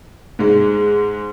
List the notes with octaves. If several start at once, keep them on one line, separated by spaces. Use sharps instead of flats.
G#2 G#3